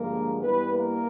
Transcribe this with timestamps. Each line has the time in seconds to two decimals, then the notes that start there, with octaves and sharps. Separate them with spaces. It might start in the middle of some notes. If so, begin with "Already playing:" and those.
Already playing: G2 D3 F3 G#3 A#3 A#4
0.40 G2 E3 G3 B3 B4
0.70 A#3 A#4